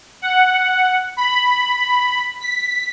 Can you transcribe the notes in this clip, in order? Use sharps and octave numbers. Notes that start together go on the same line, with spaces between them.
F#5
B5
B6